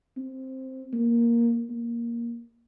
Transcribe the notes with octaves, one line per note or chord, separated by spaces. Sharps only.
C4
A#3
A#3